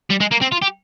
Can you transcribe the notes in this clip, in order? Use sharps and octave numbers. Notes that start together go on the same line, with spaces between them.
G3
G#3
A#3
C4
F4
G4